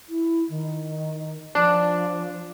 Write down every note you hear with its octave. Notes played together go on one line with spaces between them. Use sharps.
E4
D#3
F3 D4